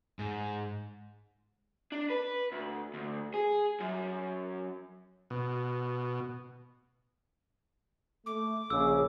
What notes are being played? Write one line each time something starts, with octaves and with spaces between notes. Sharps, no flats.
G#2
D4
B4
D2
D2
G#4
F#2
B2
A3 D6
A#1 C#3 E6